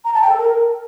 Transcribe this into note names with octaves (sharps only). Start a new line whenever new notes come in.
A#5
A5
G5
A4
A#4